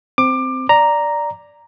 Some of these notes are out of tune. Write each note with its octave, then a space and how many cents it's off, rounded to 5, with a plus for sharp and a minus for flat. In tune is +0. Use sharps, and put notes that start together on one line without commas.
C4 -10 D6 +20
D5 +0 A#5 +0